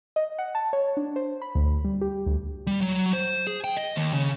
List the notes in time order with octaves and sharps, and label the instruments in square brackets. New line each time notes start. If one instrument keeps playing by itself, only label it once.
[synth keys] D#5
F#5
A5
C#5
D4
C5
B5
D2
G3
G4
D2
[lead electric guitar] G3
F#3
C5
G#4
G5
D#5
D#2
C#3